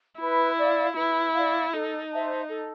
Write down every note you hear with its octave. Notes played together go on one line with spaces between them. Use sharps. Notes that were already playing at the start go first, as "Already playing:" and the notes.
E4 B4
D5
F5
E4 B4
D5 F5
D#4 A4
C5 E5 A5
A4